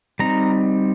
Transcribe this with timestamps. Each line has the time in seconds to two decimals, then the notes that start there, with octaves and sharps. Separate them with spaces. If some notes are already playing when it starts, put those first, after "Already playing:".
0.19 G3 C4 D#4 A#5